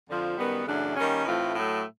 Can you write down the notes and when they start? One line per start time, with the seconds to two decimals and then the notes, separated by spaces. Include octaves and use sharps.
0.09 F2 D3 F3
0.37 F#2 D#3 G3 B3
0.67 F#2 C#3 E3 A3 D4
0.96 D#3 G3 A#3 C#4
1.25 A2 E3 A3 C4 F4
1.55 A2 F#3 A3